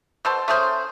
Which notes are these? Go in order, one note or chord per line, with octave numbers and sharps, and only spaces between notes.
B2 A4 C5
A3 C#4 G#4 C5